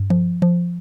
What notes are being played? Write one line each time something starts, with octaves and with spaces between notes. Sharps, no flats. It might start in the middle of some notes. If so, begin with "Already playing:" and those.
Already playing: G2
F3
F3